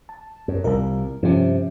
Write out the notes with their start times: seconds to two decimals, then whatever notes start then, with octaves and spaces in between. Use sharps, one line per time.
0.09 A5
0.48 F#2
0.64 C2 A#2 A#4
1.23 G2 C3 F3 C#4